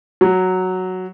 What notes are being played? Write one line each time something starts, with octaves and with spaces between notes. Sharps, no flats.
F#3